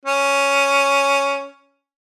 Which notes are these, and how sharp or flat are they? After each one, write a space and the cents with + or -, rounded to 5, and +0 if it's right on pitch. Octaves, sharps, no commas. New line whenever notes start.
C#4 +5